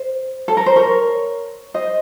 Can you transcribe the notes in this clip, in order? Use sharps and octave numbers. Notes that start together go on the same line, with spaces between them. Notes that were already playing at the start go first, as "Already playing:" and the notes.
Already playing: C5
A4
A#4
C5
A#4 C#5
C5 D#5